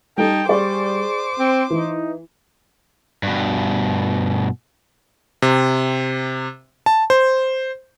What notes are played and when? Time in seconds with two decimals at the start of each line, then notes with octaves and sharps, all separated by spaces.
0.18 G3 D#4 A4 G5 A5
0.49 G3 G#4 C5 D5 C#6 D6
1.39 C4
1.70 E3 D#4
3.23 G2 B2
5.42 C3
6.86 A5
7.10 C5